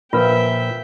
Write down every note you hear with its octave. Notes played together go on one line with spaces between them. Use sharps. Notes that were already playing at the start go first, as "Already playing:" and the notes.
A#2 F3 F4 A#4 B4 E5 G5